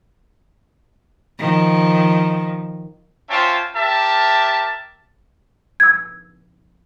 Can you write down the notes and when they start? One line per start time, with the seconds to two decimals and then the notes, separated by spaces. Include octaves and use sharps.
1.39 D#3 F3
3.29 C#4 F4 C5 E5 G5 A5
3.75 G4 A#4 E5 A5
5.80 E6 G#6